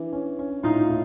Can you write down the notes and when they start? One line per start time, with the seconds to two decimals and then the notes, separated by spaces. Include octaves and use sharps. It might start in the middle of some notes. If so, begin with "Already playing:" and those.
Already playing: E3 D4
0.13 C#4
0.39 C#4
0.63 A2 D#4 F4
0.89 A2